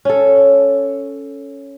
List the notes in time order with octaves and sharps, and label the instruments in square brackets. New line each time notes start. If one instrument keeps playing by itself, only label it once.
[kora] C#4 A4